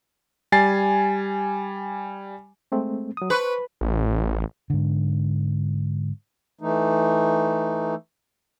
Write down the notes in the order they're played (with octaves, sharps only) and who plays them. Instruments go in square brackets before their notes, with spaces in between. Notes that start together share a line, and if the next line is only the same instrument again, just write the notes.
[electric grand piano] G3 G#5 A6 C7
[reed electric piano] G#3 A3 C4
F#3 D#6
[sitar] B4 [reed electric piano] C5 C#6
[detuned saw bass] A1
[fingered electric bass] G#2 D3
[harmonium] E3 A3 D#4